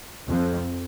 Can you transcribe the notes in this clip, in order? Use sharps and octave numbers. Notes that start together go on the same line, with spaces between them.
F2